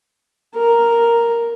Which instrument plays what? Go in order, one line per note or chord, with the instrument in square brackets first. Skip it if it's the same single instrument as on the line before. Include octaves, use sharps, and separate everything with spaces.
[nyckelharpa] A#4